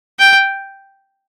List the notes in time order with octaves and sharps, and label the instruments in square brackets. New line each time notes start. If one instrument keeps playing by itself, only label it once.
[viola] G5